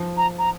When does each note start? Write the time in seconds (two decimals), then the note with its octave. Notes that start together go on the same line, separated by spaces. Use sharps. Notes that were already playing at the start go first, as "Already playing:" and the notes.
Already playing: F3
0.17 A#5
0.39 A#5